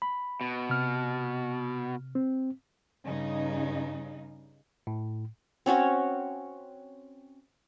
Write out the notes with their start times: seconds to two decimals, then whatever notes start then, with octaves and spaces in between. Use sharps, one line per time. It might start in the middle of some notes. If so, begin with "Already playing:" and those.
0.02 B5
0.41 B2
0.69 C3 F6
2.15 C4
3.05 G2 C#3 D#4
4.87 A2
5.66 C4 C#4 F#4 C#5